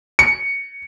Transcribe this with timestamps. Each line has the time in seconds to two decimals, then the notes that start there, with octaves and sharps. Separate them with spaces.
0.19 C#7